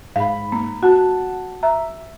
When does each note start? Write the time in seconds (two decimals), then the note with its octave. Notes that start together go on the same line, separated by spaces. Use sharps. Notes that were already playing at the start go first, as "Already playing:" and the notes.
0.16 G#2 F5 B5
0.52 A#3
0.83 F#4 F#5 A5
1.63 E5 A#5